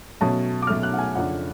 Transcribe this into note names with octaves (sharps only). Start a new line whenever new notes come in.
B2 F#3 A3 C#4 A5
D6
B2 F#3 A3 C#4 F6
F#6
F#5
G#5
F2 C#3 F3 A3 D4 F#5